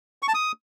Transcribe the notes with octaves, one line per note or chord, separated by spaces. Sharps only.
C#6
A5
D#6